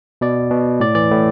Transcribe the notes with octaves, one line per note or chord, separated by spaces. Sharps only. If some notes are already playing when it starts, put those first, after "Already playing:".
B2 D5
B2
A2 D5
E3 D5
A2